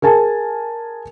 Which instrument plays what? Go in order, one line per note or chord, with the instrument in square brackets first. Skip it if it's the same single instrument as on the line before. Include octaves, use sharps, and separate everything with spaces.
[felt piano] G#4 A#4 G#5 A5